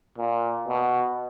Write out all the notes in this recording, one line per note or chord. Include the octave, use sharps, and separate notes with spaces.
A#2
B2